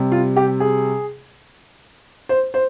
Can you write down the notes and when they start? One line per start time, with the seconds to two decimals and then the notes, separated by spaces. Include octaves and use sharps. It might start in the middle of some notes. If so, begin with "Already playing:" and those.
Already playing: C3 G3
0.12 F4
0.36 G4
0.60 G#4
2.29 C5
2.54 C5